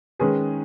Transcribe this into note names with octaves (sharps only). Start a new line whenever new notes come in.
D#3 G#3 C#4 G#4 B4